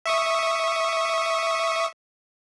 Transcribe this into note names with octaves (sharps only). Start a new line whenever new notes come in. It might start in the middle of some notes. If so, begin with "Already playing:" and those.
E5 C#6 D#6